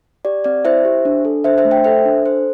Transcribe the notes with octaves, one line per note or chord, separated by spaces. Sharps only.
G4 D5
C4 D5
E4 C5 E5
G4
D4
A4
D4 C5 E5
C5 E5
A3
E5 G5
A4 C5 E5
D4
A4 C5